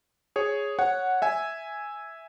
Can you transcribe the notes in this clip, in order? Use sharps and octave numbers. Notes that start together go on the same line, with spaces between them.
G#4 C#5
C#5 F#5
E5 G#5